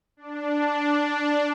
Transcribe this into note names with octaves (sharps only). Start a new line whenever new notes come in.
D4